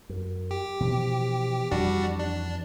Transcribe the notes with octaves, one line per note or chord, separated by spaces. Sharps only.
F#2
G4
B2 E3 F3
F2 E3 G3 D4 F#4
D4